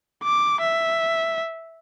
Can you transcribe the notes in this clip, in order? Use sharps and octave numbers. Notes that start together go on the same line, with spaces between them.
D6
E5